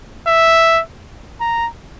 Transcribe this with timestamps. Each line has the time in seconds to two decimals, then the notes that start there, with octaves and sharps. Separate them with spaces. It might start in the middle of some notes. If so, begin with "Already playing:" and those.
0.28 E5
1.41 A#5